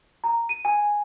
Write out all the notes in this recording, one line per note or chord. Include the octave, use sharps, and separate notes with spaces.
A#5
D#7
G#5